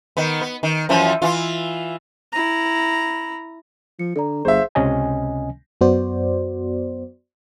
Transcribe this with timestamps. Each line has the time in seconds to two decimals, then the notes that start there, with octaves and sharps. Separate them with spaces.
0.17 D#3 B3
0.41 B3
0.63 D#3
0.89 F#2 E3 F3
1.22 E3 F4
2.32 E4 A#5
3.99 F3 C#7
4.16 D3 A4 D5 A#5
4.45 G1 G#4 C5 E5 F5
4.75 C#2 C3 C#4 D#5 G#5
5.81 F#2 B3 F#4 C5 D5